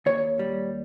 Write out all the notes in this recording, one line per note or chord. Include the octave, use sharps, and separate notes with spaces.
D#2 C#5
G3